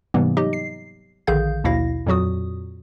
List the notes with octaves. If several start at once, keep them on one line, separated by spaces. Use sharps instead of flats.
G#2 C3 E3 G3 A#3 B3
F#3 D#4 G4 D#5
C7
A#1 D3 D#3 G#4 F5 G6
A#1 D#2 B2 E4 F5 A#6
F2 A#2 F#3 F#4 D#6